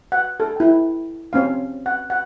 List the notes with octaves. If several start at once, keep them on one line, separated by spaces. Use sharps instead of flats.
F#5
A4
E4 G5
C4 C#4 F5
F#5
F#5